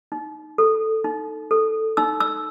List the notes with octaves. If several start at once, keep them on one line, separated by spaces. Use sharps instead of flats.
D#4
A4
D#4
A4
D#4 E6
E6